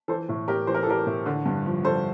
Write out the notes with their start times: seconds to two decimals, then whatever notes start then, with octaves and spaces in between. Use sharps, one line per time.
0.08 E3 A4 C5
0.29 A2
0.48 A2 G4 A#4
0.67 E3 C5
0.74 A#4
0.83 A4
0.87 E3 G4 A#4
1.07 A2
1.26 D3
1.46 G2
1.66 F3
1.84 G2 A4 C5